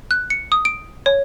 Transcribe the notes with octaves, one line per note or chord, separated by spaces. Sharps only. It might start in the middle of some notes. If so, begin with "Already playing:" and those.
F#6
C#7
D#6
D7
C#5